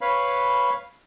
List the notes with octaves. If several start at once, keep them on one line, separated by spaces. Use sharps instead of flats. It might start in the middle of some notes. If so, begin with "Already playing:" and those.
B4 C#5 F5 B5